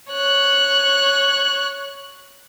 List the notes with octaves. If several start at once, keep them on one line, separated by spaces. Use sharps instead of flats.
C#5 F#6